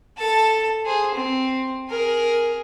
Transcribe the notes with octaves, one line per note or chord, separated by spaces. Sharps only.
A4 A5
G#4 C5
C4
G#4 A#4